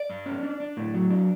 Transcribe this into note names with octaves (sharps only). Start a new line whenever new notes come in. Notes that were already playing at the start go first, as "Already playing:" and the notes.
Already playing: D5
G2
C#4
D4
D4
A2
F#3
D4